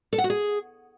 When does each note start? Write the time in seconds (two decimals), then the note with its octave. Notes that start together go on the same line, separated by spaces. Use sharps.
0.13 A4
0.18 F#5
0.24 F#4
0.30 G#4